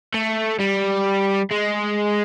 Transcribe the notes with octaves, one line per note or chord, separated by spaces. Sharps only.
A3
G3
G#3